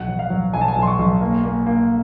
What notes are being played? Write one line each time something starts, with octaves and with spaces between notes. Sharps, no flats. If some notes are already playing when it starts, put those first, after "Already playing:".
Already playing: B1 F#5
F#3
F5
F#3
B1 G#5
A5
G#5
B1
C6
C#6
B1
A#3
A#3
A#3